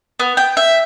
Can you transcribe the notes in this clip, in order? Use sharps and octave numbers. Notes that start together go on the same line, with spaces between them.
B3
G5
E5